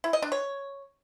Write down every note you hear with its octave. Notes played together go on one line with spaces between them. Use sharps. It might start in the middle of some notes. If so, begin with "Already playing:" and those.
E4
D#5
D4
C#5